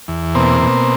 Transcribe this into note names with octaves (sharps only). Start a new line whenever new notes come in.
E2
B2 A#3 C4
B2